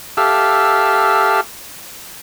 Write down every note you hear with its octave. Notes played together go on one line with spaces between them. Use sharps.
G4 A4 E5 F5